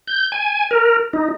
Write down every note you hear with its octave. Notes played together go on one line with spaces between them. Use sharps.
G6
G#5
A#4
D#4